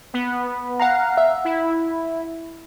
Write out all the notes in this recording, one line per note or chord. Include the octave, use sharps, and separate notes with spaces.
B3
F5 F#5 A#5
E5
E4